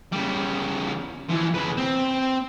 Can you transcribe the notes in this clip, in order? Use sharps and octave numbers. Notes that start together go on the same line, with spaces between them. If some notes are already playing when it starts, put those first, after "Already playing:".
C#3 G3
E3 F3
C#3 B4
C4